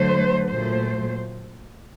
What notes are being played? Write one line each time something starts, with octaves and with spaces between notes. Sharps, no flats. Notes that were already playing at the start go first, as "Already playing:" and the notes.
Already playing: D3 F#3 A3 C5
A#2 F#3 A3 C5